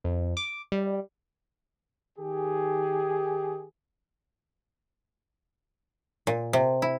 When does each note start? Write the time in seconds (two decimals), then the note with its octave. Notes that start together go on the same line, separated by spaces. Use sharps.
0.04 F2
0.37 D6
0.72 G3
2.19 D#3 G4 G#4
6.27 A#2
6.53 C3
6.82 E4